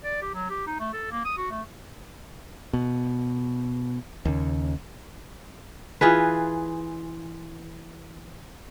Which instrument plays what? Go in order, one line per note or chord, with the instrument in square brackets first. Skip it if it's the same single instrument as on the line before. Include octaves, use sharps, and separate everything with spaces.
[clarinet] D5
G4
F#3
G4
D#4
A3
A4
A#3
D#6
F#4
A3
[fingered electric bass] B2
D#2 C#3
[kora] E3 F4 G#4 B4